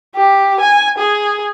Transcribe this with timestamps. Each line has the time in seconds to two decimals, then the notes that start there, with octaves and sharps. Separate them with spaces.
0.15 G4
0.60 G#5
0.98 G#4